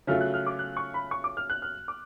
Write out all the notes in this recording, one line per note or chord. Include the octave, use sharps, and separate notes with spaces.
C#3 F#3 A3 F4 F6
F#6
F6
D6
F#6
C#6
B5
C#6
D6
F6
F#6
F6
D6